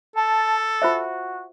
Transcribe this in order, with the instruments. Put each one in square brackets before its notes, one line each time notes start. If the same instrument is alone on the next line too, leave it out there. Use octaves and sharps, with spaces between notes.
[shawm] A4 [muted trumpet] A5
[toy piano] F4 C5 E5 [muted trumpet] F#4